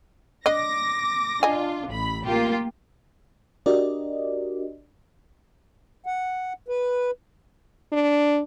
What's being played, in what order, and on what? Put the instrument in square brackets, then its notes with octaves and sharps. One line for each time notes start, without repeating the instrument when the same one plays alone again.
[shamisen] D4 D#5 [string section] D6 A#6
[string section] D4 F4 [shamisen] D#5 G#5
[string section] A1 B5
A#3 F4 G4
[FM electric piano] D4 F#4 G4 A#4 D5 D#5
[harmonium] F#5
B4
[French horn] D4